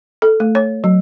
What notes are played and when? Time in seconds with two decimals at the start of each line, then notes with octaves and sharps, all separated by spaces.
0.22 A4
0.40 A3
0.55 C#5
0.84 F#3